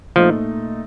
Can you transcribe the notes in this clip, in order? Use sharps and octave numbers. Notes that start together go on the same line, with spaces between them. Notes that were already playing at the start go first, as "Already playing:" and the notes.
A#2 F3 A3 D#4